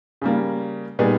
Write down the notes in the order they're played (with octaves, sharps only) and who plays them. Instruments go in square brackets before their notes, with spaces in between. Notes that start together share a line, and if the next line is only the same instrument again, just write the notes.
[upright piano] C#3 G3 A#3
A#2 G3 B3 D#4 G#4